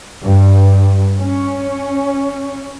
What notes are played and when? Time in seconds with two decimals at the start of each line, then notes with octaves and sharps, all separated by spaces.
0.22 G2
1.18 C#4